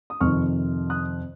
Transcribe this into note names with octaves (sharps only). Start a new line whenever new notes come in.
D#6
F2 C3 D#3 C#6 F6
D#6 F#6